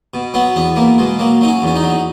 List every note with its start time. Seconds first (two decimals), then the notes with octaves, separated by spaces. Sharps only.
0.14 B2
0.34 F#3 B3
0.55 E2 B3
0.76 B2 A#3
0.98 B2 G#3
1.19 F#3 A#3
1.41 F#3 D#4
1.48 C#4
1.62 E2 C#4
1.76 D#4
1.83 F#3